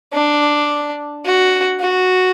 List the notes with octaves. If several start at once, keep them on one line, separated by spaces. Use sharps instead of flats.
D4
F#4
F#4